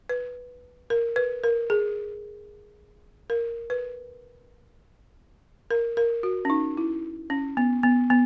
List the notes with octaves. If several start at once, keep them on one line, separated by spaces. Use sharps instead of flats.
B4
A#4
B4
A#4
G#4
A#4
B4
A#4
A#4
F#4
C#4
D#4
E4
C#4
B3
B3
B3